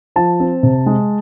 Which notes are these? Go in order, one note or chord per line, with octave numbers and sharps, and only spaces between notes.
F3 A5
C4
C3
G#3